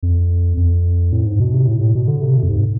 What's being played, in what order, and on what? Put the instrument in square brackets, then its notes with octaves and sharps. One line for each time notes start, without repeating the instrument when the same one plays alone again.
[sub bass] F2
F2
A2
G#2
B2
C3
A2
A2
B2
D3
C3
B2
F2
G#2